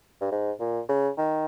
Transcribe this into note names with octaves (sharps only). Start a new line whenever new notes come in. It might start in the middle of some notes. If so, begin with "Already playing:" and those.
G2
G#2
A#2
C#3
D#3